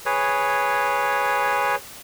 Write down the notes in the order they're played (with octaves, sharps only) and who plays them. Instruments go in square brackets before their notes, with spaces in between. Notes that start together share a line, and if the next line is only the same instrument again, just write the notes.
[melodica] G#4 B4 C#5